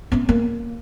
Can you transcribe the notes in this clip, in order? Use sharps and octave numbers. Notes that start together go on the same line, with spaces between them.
B3 C#4
A#3